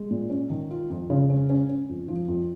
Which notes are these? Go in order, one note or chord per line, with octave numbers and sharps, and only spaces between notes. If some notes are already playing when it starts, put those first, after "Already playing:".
Already playing: G#3
A#2
C#4
D#3
F4
F2
C#3
C#4
C#4
C#4
F2
F3
F2